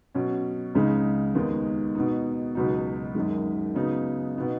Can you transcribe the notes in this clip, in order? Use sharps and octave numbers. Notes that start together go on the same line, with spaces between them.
B2 F#3 C#4
C#2 C#3 G#3 D#4
D#2 D#3 G#3 B3 D#4
B2 B3 D#4
C#2 B2 F#3 D#4
F#2 D#3 G#3
C#3 F#3 B3 D#4
B2 B3 D#4